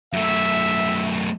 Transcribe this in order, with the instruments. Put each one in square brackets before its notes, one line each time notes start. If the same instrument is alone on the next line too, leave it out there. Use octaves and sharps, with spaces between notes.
[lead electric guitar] F#2 A3 [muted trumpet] E5